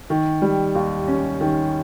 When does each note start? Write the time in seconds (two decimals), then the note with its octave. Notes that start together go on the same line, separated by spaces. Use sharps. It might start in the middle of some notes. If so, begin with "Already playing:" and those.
0.10 D#3
0.42 G3
0.75 D#2
1.08 C#4
1.41 D#3